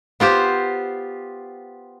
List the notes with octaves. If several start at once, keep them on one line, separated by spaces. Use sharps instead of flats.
B3 F4 G4 C5